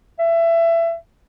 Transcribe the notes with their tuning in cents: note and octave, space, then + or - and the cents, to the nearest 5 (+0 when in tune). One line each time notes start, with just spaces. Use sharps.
E5 +25